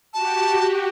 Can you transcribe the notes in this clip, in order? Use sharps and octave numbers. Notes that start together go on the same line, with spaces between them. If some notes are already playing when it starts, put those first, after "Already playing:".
F#4 G4 A5